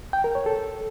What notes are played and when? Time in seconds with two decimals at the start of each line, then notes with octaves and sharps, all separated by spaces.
0.13 G5
0.24 A#4
0.35 C#5
0.46 A4